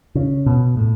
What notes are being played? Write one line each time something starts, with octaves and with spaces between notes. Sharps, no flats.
C#3
B2
A2